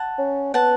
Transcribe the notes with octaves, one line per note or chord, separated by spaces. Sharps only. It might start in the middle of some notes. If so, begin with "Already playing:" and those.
Already playing: F#5 A5
C#4
B3 F#5 A5